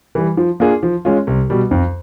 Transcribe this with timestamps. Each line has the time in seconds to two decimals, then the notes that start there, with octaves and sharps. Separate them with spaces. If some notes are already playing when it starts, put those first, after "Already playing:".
0.15 E3 G3
0.37 F3
0.60 A#3 D4 F4 G#4
0.83 F3
1.05 G#3 C#4 F4
1.27 C2
1.50 B2 G3
1.71 F2